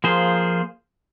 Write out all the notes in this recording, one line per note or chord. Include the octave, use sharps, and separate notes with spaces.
F3 A#3 F4 G#4 C5